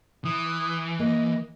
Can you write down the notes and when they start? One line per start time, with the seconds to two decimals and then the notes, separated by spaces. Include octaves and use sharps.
0.25 E3 D#6
0.99 A#3 D#5